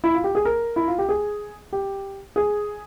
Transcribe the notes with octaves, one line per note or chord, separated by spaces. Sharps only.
E4
F4
G4
G#4
A#4
E4
F4
G4
G#4
G4
G#4